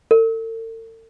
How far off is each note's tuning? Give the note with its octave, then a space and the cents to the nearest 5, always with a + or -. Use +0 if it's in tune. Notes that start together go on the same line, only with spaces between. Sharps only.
A4 +45